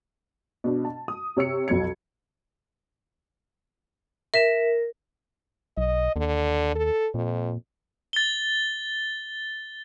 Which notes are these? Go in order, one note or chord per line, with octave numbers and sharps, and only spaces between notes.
B2 D4
A5
D#6
C3 C#5 E6 C#7
B1 F2 F#3 G#6 C#7
A#4 E5 B6 E7
B1 D#5
D#2 D3
A4
F2 A#2
A6 G7